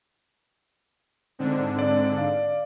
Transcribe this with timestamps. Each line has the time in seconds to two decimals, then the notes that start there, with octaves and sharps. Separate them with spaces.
1.39 G#2 D3 C4 D4
1.79 D5
2.17 F5